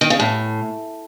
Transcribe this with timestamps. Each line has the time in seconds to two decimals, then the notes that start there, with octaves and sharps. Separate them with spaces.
0.01 D#3
0.10 C#3
0.20 A2